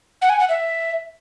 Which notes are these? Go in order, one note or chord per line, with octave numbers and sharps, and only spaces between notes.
F#5
G#5
F#5
E5